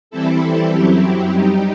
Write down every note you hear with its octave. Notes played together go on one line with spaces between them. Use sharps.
E3 G3 C4 E4 A4
F#2 F#3 C4 E4 G4
G3 D#4 G4